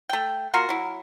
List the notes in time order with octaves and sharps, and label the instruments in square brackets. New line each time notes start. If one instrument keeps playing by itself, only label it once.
[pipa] A3 G5
A#3 F4 F#4 A#4
F#3 E4